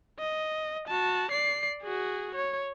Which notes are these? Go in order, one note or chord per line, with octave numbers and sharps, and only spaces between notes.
D#5
F#4 A5
D5 C7
F#4 G#4
C#5